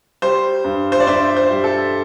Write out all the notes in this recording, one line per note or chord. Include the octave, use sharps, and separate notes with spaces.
G3 C5
G2
C5
D5
G2 C5 E5
C5
G3
A4